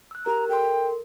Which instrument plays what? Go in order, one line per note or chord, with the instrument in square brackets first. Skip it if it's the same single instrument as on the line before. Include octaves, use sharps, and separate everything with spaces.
[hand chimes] E6 F#6
[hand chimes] G4 A#4 [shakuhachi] A#5
[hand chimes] A4 A#4 C6 [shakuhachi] G5